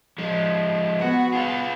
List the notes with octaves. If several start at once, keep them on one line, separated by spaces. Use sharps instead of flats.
F3 G#3
B3 F#4
F4 G#4